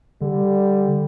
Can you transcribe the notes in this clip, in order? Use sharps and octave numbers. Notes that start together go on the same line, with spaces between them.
D3 G3